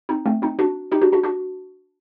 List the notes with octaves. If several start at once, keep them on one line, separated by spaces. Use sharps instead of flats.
C4 D#4
A3 C4
C4 D#4
D4 F#4
D#4 G4
D4 F#4
D4 F#4
D4 F#4